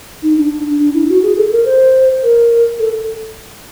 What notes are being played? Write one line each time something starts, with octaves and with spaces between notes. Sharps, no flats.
D#4
D4
D4
E4
F#4
G#4
A4
A#4
C5
A#4
A4